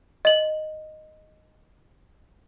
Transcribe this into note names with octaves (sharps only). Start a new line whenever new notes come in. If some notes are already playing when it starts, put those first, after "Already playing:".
D#5 F#7